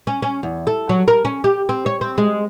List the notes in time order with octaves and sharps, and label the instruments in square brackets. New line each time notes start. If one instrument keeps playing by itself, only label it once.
[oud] C#4
C#4
E2
A4
F#3
A#4
C#4
G4
C4
C#5
C4
G#3